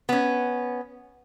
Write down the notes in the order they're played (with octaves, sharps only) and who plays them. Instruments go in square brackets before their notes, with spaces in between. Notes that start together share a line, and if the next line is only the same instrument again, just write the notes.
[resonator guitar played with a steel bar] B3 C#4